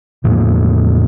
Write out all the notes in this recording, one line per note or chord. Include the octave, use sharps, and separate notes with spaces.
E2 A2 F3 A#3